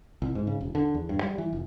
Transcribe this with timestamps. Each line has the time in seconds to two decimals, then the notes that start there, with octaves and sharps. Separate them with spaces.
0.22 C2
0.35 G#2
0.47 C#3
0.61 E1
0.75 D3
0.94 E2
1.09 G2
1.23 G3
1.38 E3
1.53 F1